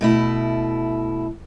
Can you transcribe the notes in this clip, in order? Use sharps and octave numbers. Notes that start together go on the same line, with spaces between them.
B2 A3 E4